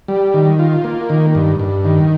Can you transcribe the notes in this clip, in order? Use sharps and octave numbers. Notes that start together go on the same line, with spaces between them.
G3
D#3
F4
A#3
D#3
G2
G2
D#3